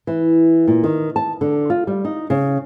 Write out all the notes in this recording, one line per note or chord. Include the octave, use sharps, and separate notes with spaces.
E3
A#2
D#3
A5
D3
F4
G3
D#4
C#3